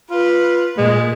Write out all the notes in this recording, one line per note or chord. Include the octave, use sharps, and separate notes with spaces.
F4 B4
A#2 G#3